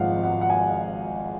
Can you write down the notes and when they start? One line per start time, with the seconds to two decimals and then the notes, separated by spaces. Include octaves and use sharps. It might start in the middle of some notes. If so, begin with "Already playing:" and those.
Already playing: G#1 G#2 F3 G#3 F5 F#5
0.23 F#5
0.41 F#5
0.50 G#5